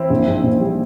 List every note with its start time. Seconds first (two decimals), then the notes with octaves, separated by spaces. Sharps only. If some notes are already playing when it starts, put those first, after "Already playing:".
Already playing: E3 C4 E4
0.10 A#1
0.27 G#2
0.44 A#1
0.61 G3